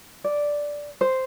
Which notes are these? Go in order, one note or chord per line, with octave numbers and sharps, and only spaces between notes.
D5
C5